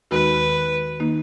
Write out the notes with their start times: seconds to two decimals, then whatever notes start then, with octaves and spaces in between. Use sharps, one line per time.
0.11 D#2 D#3 G#3 D#4 F#4 B4
1.00 D#3 A#3 D#4